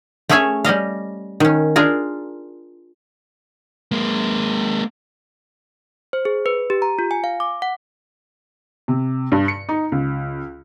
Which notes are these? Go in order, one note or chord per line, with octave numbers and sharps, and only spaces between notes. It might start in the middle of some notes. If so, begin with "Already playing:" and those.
A3 C#4 G#4 C#5 E5 G#5
G3 C#4 D#5 F5
D#3 C#4
D4 F4 G#4 A#4
G#3 A#3
C5
G#4
B4
G4
A#5
F4
G#5
F5
D6
F#5
C3
G2
C#7
D#4
C#2